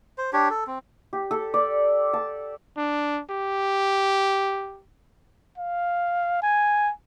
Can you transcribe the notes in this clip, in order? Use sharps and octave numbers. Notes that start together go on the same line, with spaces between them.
C5
D4 G4 C#5
A4
C4
G4
A4
D5
A5
D4
G4
F5
G#5